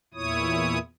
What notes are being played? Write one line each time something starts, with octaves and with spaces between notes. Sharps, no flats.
E2 A#2 E4 C#5 D#6